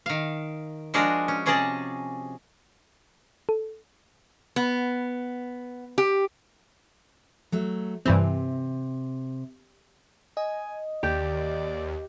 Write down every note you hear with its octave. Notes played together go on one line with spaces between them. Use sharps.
D#3 F5
F3 G#3 D4 F#4 G#4 A#4
C#4
C3 C#4 G#4 D5 D#5 A5
A4
B3
G4
F#3 A3
G2 C3 E3 C4
D#5 G#5
D#2 G4 D5